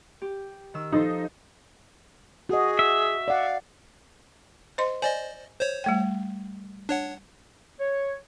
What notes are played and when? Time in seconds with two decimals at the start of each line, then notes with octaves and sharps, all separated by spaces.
0.22 G4
0.74 D#3 E6
0.92 F3 D#4 A4 C5
2.49 F#4 G#4 D#5
2.79 E5
3.28 D5 F5 F#5
4.78 C5 D#5 C6
5.02 C5 D5 D#5 G#5
5.61 C5 C#5
5.84 G3 A3 G5
6.89 D4 C#5 F#5
7.79 C#5